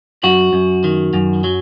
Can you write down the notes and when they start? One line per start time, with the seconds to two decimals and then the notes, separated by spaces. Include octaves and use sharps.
0.23 F#2 F#4
0.53 F#2
0.84 D#3
1.13 F#2
1.44 F#3